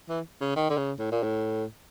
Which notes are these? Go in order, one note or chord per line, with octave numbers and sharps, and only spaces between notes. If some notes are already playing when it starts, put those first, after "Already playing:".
E3
C#3
D#3
D3
C#3
A2
A#2
A2